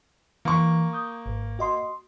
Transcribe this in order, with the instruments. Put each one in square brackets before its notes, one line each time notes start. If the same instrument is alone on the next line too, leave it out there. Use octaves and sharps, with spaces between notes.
[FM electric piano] E3 [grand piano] A#3 C#6
[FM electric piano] D#6 G6
G#1
F#4 D#5 C6